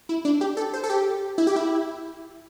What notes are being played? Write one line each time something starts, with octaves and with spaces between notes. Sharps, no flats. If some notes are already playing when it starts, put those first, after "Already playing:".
E4
D4
G4
A4
C5
A4
G4
E4
G4
E4